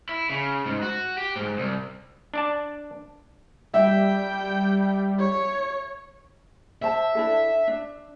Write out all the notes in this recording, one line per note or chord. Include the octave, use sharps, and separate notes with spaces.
E4
C#3
G#2
F#4
G4
G#2
C2
D4 D5 A5
G3 E5 G5
C#5
C5 E5 A5
D4 E4 A4
D4